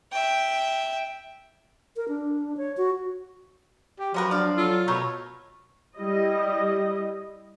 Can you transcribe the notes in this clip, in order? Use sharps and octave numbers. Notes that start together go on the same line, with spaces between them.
E5 G5
A#4
D4
C#5
F#4
G4
F3 F#3 C#4 F#4 A#4 B4
D4 D5 F5
F#3 F4 A4
B2 A3 A#4 C#5 B5
G3 E4 D#5